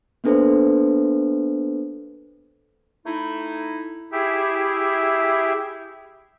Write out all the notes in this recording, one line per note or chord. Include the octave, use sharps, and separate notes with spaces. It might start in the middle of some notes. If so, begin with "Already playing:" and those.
A#3 B3 D4 A4 B4 C5
A3 D#4 E4
E4 G4 G#4 E5